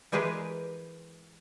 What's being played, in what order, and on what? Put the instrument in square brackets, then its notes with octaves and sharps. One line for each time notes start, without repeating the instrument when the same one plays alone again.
[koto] E3 G#3 G4 G#4 A#4 B4